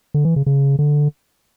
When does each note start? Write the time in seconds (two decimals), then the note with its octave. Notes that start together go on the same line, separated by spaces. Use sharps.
0.14 D3
0.25 E3
0.36 C#3
0.46 C#3
0.79 D3